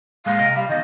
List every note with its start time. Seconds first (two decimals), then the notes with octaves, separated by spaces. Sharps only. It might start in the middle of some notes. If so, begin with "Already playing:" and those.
0.26 A2 G#3 A#3 F5
0.39 C3 A#4 D#5
0.56 G3 F5
0.69 E2 D#3 D#5